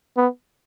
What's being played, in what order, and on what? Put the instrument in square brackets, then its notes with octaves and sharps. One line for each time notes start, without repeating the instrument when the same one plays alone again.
[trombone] B3